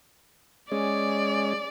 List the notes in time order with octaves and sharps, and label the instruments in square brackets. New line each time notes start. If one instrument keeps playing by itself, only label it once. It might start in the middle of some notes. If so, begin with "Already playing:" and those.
[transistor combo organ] G#3 C#4 [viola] D5